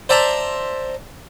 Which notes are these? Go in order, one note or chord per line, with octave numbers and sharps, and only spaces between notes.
C5 D5 E5 A5 A#5 C6